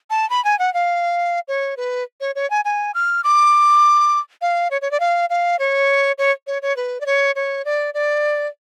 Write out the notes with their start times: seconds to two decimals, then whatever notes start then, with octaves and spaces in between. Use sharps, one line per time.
0.10 A5
0.30 B5
0.45 G#5
0.59 F#5
0.74 F5
1.48 C#5
1.77 B4
2.21 C#5
2.36 C#5
2.50 G#5
2.65 G#5
2.94 F6
3.24 D6
4.42 F5
4.71 C#5
4.82 C#5
4.91 D5
5.00 F5
5.30 F5
5.59 C#5
6.18 C#5
6.47 C#5
6.62 C#5
6.77 B4
7.01 D5
7.06 C#5
7.36 C#5
7.65 D5
7.94 D5